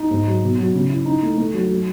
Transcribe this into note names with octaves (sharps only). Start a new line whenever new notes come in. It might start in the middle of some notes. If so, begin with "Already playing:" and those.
Already playing: D#4
G#2
F#3
B2
F#3
C#3
E4
D#4
A3
A3
F#3
F#3